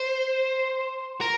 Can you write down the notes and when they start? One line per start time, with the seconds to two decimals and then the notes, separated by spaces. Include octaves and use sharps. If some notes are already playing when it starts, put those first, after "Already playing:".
Already playing: C5
1.21 A#4